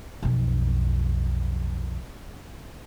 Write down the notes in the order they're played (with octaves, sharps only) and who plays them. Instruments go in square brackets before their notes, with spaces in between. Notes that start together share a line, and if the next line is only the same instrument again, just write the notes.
[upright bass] B1 F2